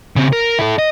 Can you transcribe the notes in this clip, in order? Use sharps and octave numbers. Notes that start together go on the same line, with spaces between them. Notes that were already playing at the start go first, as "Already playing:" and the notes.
C#3 C4
A#4
E4 A4
D#5